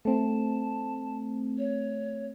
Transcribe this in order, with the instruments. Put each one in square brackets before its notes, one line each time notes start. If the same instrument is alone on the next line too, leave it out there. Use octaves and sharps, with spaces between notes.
[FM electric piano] A3 C4 [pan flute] A5
[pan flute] C#5